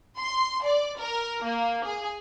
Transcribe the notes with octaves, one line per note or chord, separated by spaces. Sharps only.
C6
D5
A#4
A#3
G#4